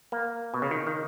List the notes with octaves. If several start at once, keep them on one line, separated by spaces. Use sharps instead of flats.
A#3
B2
C#3
D#3
D#3